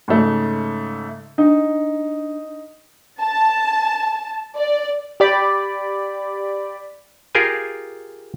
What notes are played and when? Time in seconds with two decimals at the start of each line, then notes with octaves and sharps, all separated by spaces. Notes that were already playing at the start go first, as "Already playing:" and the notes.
0.08 G#2 C#3 A3
1.38 D4 D#4
3.21 A5
4.56 D5
5.20 G4 D5 B5
7.35 F4 G4 G#4 A#4 G5 G#5